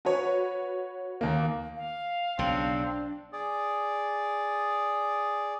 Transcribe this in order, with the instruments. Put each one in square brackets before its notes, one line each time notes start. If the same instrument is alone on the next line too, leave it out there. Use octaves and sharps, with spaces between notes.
[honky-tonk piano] F#4 B4 C#5
[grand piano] D#2 A#3
[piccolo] F5
[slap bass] B1 C#3 [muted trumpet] C4 [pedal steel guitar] D4
[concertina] G#4 D5